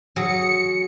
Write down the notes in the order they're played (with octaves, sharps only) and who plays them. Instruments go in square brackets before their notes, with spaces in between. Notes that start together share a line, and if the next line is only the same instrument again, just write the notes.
[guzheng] F#3 G#4 [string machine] C#7